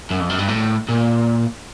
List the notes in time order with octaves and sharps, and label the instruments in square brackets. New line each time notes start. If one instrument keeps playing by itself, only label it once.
[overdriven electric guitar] F#2
F2
F#2
G2
A2
A#2